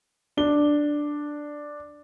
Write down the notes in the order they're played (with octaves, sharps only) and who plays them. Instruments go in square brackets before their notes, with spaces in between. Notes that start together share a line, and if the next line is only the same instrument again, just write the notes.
[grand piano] D4 G7